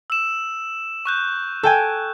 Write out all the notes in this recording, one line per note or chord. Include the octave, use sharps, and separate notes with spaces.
E6 E7
C#6 F#6 G6
A4 G5 G#5